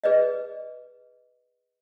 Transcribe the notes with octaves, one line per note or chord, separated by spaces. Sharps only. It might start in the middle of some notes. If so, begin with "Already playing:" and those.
G#4 B4 D5 D#5